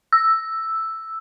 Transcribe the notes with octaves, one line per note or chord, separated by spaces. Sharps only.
E6